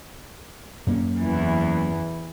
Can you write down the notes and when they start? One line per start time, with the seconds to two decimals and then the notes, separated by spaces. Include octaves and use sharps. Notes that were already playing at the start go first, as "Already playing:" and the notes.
0.87 F#2 A#3 C#4
1.20 E2 E3